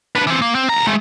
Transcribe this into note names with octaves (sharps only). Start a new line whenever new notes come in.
D4 B4
E3 C4
A#3
C4
D2 A#5
G#3 A3